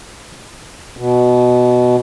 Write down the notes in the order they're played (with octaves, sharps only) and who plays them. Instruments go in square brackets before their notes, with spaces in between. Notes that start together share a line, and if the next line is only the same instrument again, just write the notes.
[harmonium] B2